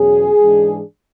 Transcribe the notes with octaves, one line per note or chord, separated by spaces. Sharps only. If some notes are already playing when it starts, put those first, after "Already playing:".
Already playing: E2 B2 F#3 C#4 G#4
G#2 E3 G#3 D4